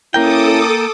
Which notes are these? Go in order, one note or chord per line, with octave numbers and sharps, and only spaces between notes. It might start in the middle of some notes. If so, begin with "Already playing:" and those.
A#3 C#4 E4 A4 A#4 G5 D6 D#6